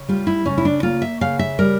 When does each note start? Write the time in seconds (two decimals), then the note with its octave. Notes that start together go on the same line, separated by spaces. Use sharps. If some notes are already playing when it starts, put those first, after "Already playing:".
Already playing: C#3
0.08 G3 F4
0.27 E4
0.46 C#3 C#4
0.58 E4
0.65 D4
0.83 A#3 F4
1.02 E5
1.21 C#3 F5
1.39 E5
1.59 G3 A#4